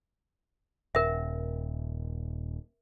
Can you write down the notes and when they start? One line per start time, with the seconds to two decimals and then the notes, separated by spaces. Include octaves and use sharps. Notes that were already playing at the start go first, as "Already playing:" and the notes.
0.95 D#1 A#4 E5